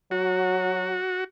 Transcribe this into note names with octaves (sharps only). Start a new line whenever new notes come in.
F#3 F#4